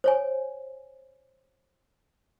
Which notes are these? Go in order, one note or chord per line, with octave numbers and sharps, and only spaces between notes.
C5 C#5 G#5